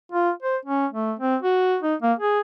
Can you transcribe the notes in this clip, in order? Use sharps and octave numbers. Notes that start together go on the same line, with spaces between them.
F4
C5
C#4
A3
C4
F#4
D#4
A#3
G#4